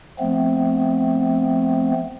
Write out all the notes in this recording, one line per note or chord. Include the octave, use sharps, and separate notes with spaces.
F3 A3 B3 C4